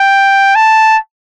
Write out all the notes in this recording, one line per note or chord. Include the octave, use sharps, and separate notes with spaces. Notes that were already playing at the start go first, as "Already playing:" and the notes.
Already playing: G5
A5